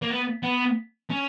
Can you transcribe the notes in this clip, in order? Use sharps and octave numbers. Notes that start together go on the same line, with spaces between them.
A#3
B3
B3
C#4